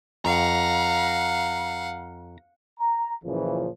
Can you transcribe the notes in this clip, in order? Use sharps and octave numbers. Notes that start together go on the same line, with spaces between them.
F2 F5 F#5 A#5
A#5
F#1 A#2 C#3 E3 F3